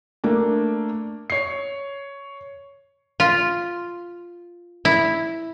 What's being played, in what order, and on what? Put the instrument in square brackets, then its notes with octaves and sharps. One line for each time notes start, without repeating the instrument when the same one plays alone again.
[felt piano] A3 A#3 D4
C#5 C7
[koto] F4
E4